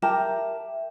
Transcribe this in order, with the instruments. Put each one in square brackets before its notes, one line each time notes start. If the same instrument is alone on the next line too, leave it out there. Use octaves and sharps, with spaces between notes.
[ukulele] G4 A#4 A5 [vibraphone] E5